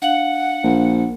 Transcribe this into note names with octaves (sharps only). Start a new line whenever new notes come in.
D4 F5 F#5 F#7
A#1